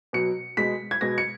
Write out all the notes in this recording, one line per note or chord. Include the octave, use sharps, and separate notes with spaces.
B2 F#3 C#7
B2 G#3 B6
G#6
B2 G#3 A#6
C#7